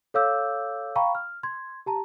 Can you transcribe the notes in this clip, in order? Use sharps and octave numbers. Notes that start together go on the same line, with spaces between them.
A4 C#5 F5 D6 E6 G6
F5 G5 A#5 B5 C#6
F6
C6 G#6
G4 A5 A#5